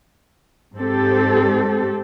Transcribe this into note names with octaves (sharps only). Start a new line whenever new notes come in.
G#2 C4 G4 A4